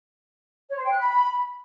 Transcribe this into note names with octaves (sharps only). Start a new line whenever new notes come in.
C#5
C5
G5
F#6
B5